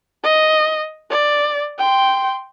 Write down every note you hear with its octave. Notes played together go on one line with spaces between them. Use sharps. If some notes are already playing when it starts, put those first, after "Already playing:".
D#5
D5
G5 C6